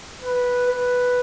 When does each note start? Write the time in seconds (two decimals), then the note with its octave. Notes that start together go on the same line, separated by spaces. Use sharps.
0.22 B4
0.69 B4